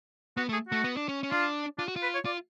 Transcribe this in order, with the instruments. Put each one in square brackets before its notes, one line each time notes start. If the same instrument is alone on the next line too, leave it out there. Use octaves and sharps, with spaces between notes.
[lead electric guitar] B3 [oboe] F#4
[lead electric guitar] A3
[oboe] G#4
[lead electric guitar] A3 [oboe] F#4
[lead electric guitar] B3
D4
C#4
C#4
[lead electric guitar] D4 [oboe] F4
[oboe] D4 [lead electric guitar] F4
[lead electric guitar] F#4
F4
[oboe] B4
C#5
[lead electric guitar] F4 [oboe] D5